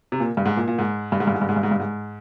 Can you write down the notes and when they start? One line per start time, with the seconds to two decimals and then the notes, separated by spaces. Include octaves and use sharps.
0.12 C3
0.20 A#2
0.37 G2
0.45 G#2
0.57 A#2
0.68 A#2
0.78 G#2
1.12 G2
1.20 G#2
1.27 G2
1.34 G#2
1.41 G2
1.49 G#2
1.56 G2
1.63 G#2
1.71 G2
1.80 G#2